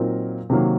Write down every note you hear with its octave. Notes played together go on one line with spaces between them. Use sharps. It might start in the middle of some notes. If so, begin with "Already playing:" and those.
Already playing: A#2 F#3 C4 D#4 A#4
C3 D#3 F#3 A#3